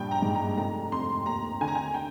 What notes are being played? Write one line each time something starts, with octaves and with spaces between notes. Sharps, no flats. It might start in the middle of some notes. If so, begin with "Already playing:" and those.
Already playing: A#1 G2 G5
A#5
G#2
A#5
F1 A#5
F2 C6
D#2 A#5
D3 G#5
A#5
G#5
G5